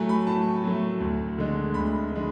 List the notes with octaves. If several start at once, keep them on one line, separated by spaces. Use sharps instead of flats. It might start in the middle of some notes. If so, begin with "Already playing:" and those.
Already playing: A2 F#3 A3 G#5
B5
A2 A5
F#3 A3
D2
D3 G#3
D2 B5
D3 G#3